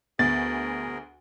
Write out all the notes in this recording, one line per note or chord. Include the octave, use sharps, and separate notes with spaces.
D2 B3 G#4 A#4 A6